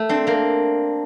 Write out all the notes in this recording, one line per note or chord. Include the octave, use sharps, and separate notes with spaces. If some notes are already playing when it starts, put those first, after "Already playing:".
Already playing: A3
C4 D4
A#3 C4